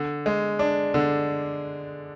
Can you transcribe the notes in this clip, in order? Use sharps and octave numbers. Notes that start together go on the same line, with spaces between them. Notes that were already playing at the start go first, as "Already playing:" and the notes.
Already playing: D3
G#3
D4
D3